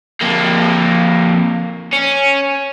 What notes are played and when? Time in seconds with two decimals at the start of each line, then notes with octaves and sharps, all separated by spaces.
0.21 F2 A#3
1.93 C#4